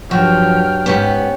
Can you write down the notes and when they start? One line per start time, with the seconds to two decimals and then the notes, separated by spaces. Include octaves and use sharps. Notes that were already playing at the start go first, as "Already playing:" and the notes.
0.11 G2 F3 F#3 F#4 G5 F6
0.86 G#2 B3 C#4 G4